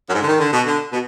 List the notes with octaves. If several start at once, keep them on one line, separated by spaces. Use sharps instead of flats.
F#2
G#2
D3
D#3
D3
B2
D3
B2